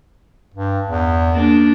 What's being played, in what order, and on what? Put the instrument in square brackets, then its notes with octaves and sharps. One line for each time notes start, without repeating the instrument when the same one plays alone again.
[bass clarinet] G2
E2
[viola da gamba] A#3 D4